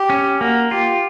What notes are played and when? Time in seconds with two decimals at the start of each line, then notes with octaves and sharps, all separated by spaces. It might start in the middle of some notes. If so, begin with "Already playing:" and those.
Already playing: G4
0.10 C#4
0.40 A#3 F#4
0.71 F4 G4